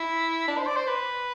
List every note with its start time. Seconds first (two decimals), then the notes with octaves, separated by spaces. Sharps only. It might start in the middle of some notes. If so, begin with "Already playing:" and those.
Already playing: E4
0.48 D4
0.58 C5
0.67 D5
0.76 C5
0.87 B4